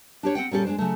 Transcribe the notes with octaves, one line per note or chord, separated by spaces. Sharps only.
D4 G4 C#5
C4 F#5 G5
A#2 G3 C#4 G4 A4
G#3 D4 C5
C#3 F#3 A3